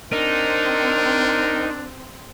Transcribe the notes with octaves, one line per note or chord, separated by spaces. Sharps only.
C4 D4 D#4 A#4